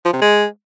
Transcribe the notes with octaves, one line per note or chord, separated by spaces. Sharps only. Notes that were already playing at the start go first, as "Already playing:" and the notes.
F3
C3
G#3